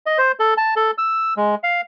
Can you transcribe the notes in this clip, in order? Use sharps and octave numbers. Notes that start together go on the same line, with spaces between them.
D#5
C5
A4
A5
A4
E6
G#3
F5